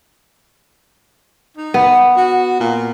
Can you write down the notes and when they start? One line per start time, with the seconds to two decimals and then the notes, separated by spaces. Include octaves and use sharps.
1.57 D#4
1.74 B3
2.16 F#4
2.60 A#2